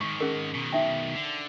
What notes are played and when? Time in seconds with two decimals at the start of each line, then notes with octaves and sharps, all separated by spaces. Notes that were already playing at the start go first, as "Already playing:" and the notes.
0.01 G#2 D#3 C#6
0.21 C#4 G#4 A#4
0.54 B2 D#3
0.72 D#4 E5 G5
1.15 D3